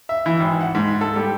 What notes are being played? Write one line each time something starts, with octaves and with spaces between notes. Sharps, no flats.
E5
E3
G#1
F#5
G#2
A4
G3